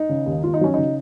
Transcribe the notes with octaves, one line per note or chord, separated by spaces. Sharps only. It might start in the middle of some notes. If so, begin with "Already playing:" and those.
Already playing: D#4
C#3
D#2
D#2 F4
D#4
F#3 C#4
C#3 D#4